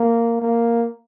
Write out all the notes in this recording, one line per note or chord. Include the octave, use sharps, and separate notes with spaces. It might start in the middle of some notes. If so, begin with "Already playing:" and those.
Already playing: A#3
A#3